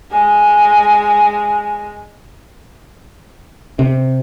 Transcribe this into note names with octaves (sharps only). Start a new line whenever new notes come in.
G#3 G#5
C3